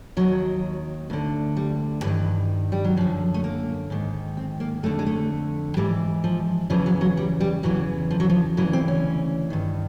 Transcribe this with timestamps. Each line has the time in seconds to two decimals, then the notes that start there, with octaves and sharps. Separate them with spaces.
0.17 D#2 D#3 F#3
1.10 D2 D3
1.57 G3
2.03 G2 D#3 E3
2.72 G3
2.84 F#3
2.97 F#2 D3 F3
3.34 A3
3.44 A#3
3.90 G#2 D#3
4.37 C4
4.60 A#3
4.83 F2 D3 A3
4.99 G#3
5.07 A3
5.77 G#2 E3 G3
6.24 F3
6.70 E2 C#3 E3 F3
6.86 F#3
7.01 F#3
7.17 G3
7.41 G3
7.63 E2 C#3 E3 F#3
8.11 F3
8.20 F#3
8.30 F3
8.57 D2 C#3 E3 F#3
8.73 C4
8.88 C#4
9.50 G2 D#3